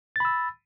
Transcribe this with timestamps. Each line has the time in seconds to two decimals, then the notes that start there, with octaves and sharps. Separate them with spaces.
0.16 A6
0.20 B5
0.25 E6